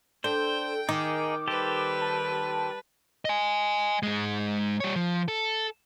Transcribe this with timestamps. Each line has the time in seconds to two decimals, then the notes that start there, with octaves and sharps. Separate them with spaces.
0.24 D4 A4 C5 G5
0.89 D#3 D#4 G#4 D6
1.48 G3 G4 A4 B4 C5
2.02 A5
3.25 D#5 G#5
4.03 G#2 G#3
4.80 G3 C#5
4.96 F3
5.28 A4